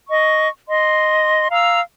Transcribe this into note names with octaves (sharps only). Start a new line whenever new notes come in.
D#5 C#6
D#5 C6
F5 A#5 E6